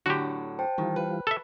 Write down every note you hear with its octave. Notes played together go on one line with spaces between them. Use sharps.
A2 D3 F#3 F#4 G4
C5 G5 A5
D#3 E3 G3 F4
B4
A4 E5